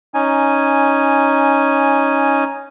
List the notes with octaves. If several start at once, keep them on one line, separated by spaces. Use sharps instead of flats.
C#4 D#4 G#5